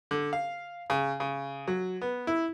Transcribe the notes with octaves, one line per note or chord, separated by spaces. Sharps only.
D3
F5
C#3
C#3
F#3
B3
E4